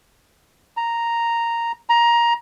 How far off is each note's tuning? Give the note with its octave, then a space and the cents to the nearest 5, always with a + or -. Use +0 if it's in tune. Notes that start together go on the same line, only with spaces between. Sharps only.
A#5 -5
A#5 +15